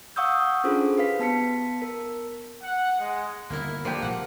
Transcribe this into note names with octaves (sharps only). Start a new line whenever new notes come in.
F5 F#5 C#6 D#6 E6 G6
C#4 D4 F4 G#4 A4 C5
G4 B4 F5 B6
B3 A5 B6 C#7
A#4
F#5
G#3
G1 D#2 B2 A#3 E4
F3 A#3 D4 G4
A#1 A#2 C#3 F#5